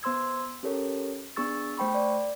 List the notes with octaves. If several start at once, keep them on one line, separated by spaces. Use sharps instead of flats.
B3 C5 C6 E6 G#6
C#4 G4 A4 A#4 C#5
B3 D4 G#4 C#6 E6 A6
A3 C5 G5 B5 C#6
D5